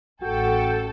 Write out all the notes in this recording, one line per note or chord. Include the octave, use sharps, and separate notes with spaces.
A1 F#4 A4 G5